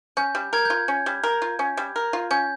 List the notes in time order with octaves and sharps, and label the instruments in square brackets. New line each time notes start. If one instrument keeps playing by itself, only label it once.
[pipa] C#4 [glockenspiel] G6
[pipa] G3
[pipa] A#4 [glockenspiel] G#6
[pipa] F4 [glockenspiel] G6
[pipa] C#4
G3
A#4
F4
C#4
G3
A#4
F4
[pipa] C#4 [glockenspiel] G6